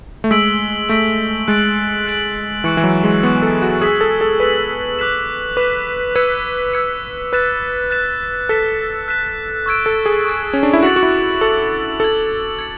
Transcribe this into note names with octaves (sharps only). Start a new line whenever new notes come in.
A3
G#3 E6 B6 D7 F#7
A3 E6 B6 D7 F#7
G#3 F#6 A6 D7 F#7
F#6 A6 D7 F#7
E3 C#6 F#6 C#7
E3
F#3
G#3
B3 C#6 F#6 C#7
A4
F#4
G#4 E6 B6 F#7
A4
A4
B4 E6 B6 F#7
D6 F#6 B6 E7
B4 D6 F#6 B6 E7
B4 E6 G#6 C#7
E6 G#6 C#7
B4 F#6 A6 E7
F#6 A6 E7
A4 F#6 B6 E7
F#6 B6 E7
C#6 E6 G#6 D7
A4
G#4
C#6 E6 G#6 D7
C#4
D4
E4
F#4 D6 A6 C#7 F#7
F#4
E4
A4 D6 A6 C#7 F#7
A4 G#6 C#7 F#7
G#6 C#7